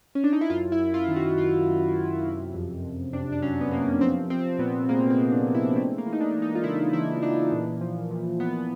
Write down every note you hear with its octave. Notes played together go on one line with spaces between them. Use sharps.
C#4
D4
D#4
E4
F#2 F4
E4
F#2
F4
D#3
F#4
F#2 F4
F#2
F#2
C3
F2
F2
C3 D4
D4
F#3 C#4
B3
C3 A#3
F3 C4
F3 C4
A#2 B3
G#3 A#3
C4
G#3
D4
G#3
E4
A3 C4
A#3
E3
D#4
D4
E3
D#4
F4
C#3 E4
E3 E4
E3 D4
A#2
F3
A#2
A#2 B3